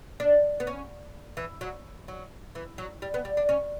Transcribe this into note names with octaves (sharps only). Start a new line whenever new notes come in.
D4
B3
C#4
E3
F#3
F#3
E3
F#3
G3
B3
G3
D4
C#4